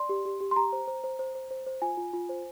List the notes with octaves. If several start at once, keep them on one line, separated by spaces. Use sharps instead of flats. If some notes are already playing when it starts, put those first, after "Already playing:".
Already playing: D5 C6
G4
G4
G4
C6
G4 A#5
C5
C5
C5
C5
C5
C5
C5
F4 G#5
F4
F4
C5